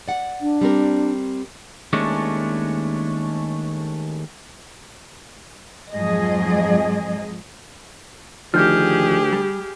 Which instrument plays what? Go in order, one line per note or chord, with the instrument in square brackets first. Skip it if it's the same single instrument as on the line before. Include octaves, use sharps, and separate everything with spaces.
[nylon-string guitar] D5 F#5
[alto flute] D4
[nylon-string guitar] G3 C4 A#4
[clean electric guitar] D#2 G#3 A3 C#4 D4
[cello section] F2 G#2 F3 F#3 G#4 D#5
[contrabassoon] D2 [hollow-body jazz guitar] D#3 F3 [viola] G4 G#4 [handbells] F6 G6
[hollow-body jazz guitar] G3